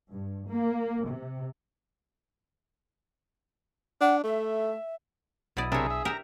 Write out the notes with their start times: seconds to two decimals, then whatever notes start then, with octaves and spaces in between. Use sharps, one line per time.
0.12 G2
0.49 A#3
1.07 C3
4.01 D4 F#5
4.24 A3 E5
5.57 B1 B2 E4 D5 D#6
5.72 C3 D4 G#4 A#4 C#5 E5
5.90 E5
6.05 G4 A#4 E5 A#5